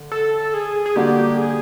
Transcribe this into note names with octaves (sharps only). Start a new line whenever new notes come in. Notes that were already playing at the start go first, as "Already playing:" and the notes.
Already playing: D3
A4
G#4
G#4
D3 G3 A#3 D4 F#4 G4
G#4